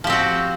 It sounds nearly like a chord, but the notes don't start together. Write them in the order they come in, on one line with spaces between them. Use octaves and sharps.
F3 G4 C4 F#4